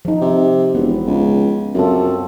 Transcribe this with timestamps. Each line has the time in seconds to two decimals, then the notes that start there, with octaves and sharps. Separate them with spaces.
0.05 F3 D#4
0.21 C3
0.75 E1 B3
1.07 C#2
1.75 F#2 C4 F4 A4